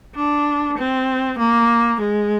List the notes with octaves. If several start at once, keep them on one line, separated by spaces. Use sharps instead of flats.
D4
C4
A#3
G#3